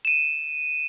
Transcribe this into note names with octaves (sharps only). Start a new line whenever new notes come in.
D#7 E7